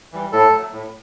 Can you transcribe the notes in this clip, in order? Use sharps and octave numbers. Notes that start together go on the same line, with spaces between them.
E3 G3
A2 A4
F#3 A3
A2